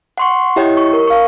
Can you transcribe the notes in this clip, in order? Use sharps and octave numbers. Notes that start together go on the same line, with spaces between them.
F#5 C6 C#6
E4 G4 C#5 D#5 G5
C#6
A#4
F5 C#6